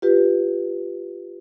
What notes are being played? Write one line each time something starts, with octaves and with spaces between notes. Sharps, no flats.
F4 G4 B4